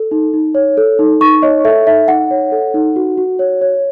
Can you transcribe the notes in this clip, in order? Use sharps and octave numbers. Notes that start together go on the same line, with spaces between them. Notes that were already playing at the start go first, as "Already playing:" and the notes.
Already playing: A4
D#4
D#4
C#5
A4
D#4
D#4 C#6
C#5 D#5
A4 E5
D#4 E5
D#4 F#5
C#5
A4
D#4
F#4
F#4
C#5
C#5